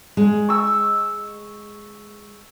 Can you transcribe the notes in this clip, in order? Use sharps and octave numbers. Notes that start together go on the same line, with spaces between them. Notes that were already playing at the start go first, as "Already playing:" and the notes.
G#3
C#6 E6